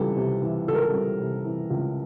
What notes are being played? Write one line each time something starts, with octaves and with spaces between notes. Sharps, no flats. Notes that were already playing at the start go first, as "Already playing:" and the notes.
Already playing: C#2 E3 G3 A4
C3
E3
C#2 A4
A#4
A4
G3
C3
E3
C#2